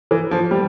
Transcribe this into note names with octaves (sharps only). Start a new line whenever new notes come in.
E3
F3
G3